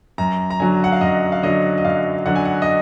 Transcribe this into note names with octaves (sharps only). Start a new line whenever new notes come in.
F#2 A#5
A#5
D3 F#3 G#5
F#5
F5
F#2 D#5
F5
D3 F#3 D#5
D#5
F#2 F5
D3 F#3 F#5
G#5
F#5
D#5